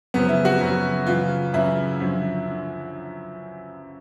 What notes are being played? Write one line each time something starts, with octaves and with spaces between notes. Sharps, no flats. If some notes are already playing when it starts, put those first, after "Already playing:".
F#2 C#3 F3 B3
E4
F#4
F#2 C#3 F3
F#2 C#3 E3 F4
F#2 C#3 E3 E4
F#2 D3 F3
D3